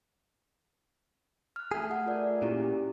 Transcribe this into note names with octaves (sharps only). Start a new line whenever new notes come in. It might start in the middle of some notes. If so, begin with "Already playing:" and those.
F6 F#6
A3 G#4
F#5
F4 A#4 D5
A#2 C#4 E4 G4